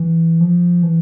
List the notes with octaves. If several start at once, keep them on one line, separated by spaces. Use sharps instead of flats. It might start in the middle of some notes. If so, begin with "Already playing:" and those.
Already playing: E3
F3
E3